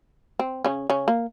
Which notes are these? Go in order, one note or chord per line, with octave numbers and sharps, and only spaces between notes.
C4
C#3 C#4
C#3 C#4
A#3